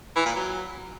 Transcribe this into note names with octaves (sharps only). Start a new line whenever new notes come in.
E3
A#2
F#3